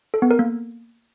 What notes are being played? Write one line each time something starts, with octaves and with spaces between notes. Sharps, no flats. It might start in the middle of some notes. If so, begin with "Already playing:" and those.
A4
B3
A#4
A#3